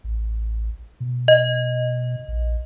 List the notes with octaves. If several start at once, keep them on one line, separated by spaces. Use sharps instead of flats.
A1
B2
D#5
A#1